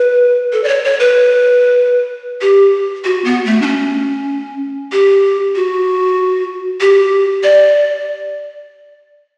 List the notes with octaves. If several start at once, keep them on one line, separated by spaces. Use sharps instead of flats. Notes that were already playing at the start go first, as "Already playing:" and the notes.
Already playing: B4
A4
D5
C#5
C#5
B4
G4
F#4
B3
A3
D4
C#4
G4
F#4
G4
D5